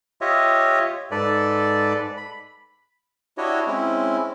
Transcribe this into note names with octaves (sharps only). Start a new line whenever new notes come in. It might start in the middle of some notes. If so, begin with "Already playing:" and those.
F4 G4 C#5 D#5 E5
G#2 A4 B4 D5
B5
D4 E4 F#4 G4 C#5 D#5
G#3 C4 C#4 E4